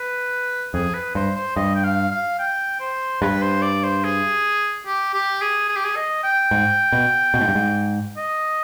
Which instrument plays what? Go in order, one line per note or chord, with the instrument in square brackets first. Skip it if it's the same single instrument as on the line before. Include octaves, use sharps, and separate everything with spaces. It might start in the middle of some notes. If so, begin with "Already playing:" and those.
Already playing: [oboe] B4
[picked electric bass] F2 [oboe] G#4
[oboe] B4
[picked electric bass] G2 [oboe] C5
[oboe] C5
[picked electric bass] G2 [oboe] D#5
[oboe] G5
F5
F5
G5
C5
[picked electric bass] G2 [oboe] B4
[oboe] C5
D5
C5
G#4
G4
G4
G#4
G#4
G4
G#4
D#5
G5
[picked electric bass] G#2
B2
B2
G#2
G2
G#2
[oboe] D#5